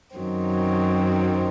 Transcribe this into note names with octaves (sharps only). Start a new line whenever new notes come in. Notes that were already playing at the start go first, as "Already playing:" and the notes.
F#2 D#3 F#3 C4